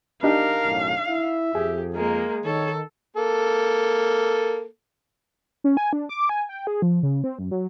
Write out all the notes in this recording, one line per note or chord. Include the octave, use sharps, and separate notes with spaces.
D4 D#4 G4 A#4 F5
B1 F#2 A2
E4 E5
F2 G4 G#4
G#3 A#3 A#4
D#3 A4 C#5
A#3 A4
C#4
G#5
D4
D6
G#5
G5
G#4
F3
C#3
C4
F#2
F#3